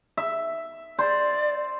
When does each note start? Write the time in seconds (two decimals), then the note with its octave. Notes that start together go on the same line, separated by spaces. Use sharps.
0.17 E5
0.99 C5 D5